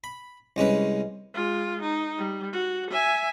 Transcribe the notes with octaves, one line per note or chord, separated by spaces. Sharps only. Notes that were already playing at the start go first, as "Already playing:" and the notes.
B5
C2 G#3 C#4 B4
G#3 F4
D#4
G3
F#4
E5 G#5